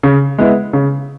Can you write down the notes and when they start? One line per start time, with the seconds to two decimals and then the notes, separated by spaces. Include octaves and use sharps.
0.03 C#3
0.38 G#3 B3 E4
0.73 C#3